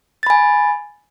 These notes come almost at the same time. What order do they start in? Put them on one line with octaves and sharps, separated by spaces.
A6 B5 G#5